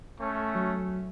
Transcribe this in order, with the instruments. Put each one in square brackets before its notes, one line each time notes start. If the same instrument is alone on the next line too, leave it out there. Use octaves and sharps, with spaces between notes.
[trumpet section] A3 C#4
[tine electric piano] F#3